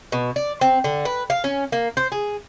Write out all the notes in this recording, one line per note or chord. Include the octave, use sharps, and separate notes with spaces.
B2
D5
C4
D3
B4
F5
C#4
A#3
C5
G#4